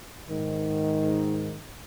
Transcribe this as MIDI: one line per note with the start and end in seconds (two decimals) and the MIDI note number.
0.30 1.58 44
0.30 1.58 51